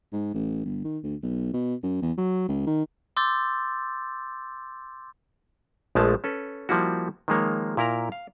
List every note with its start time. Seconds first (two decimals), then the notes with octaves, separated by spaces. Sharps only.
0.13 G#2
0.34 A1
0.65 G1
0.84 D#3
1.04 D2
1.23 B1
1.53 B2
1.83 F#2
2.02 E2
2.17 F#3
2.48 C#2
2.67 D#3
3.17 C6 D6 E6 G6 A6
5.95 A#1 F3 G#3 A3 A5
6.24 C#4 A4 B4
6.69 F3 G3 A#3 E4 F#4
7.28 D#3 F3 G#3 A#3 C#5
7.77 A#2 E4 A#4 A#5
8.12 F5